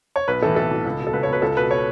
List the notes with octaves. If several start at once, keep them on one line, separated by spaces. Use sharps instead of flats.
C#5
B1 B4
A2 E3 A4
B1 A4
A2 E3
C#2
B2
A4
C#2 B4
C#5
B2 B4
C#2 A4
B2 B4
C#5